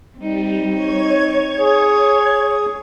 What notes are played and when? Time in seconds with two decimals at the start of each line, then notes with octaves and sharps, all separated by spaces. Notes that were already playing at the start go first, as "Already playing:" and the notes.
0.18 G3 C4 D#4
0.69 C#5 G#6
1.59 G#4